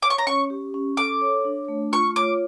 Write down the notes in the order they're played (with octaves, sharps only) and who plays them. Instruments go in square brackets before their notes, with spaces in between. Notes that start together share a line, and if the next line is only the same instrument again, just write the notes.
[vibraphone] C#5 [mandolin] D6
[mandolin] C#6
A#5
[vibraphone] C#4 [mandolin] C#6
[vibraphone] G4
C#4
[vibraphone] A4 [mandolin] D6
[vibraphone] C#5
D4
A3
[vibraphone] F4 [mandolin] C#6
[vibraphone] C#5 [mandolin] D6